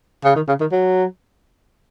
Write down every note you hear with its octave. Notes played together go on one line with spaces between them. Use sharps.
C#3
D#3
C#3
D#3
F#3